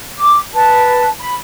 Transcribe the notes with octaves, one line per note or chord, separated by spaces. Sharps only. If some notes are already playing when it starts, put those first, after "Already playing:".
D6
B4 A5
B5